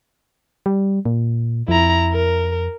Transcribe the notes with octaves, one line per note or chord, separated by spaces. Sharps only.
G3
A#2
F2 E4 A#5
A#4